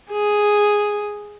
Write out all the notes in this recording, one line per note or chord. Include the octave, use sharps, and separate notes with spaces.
G#4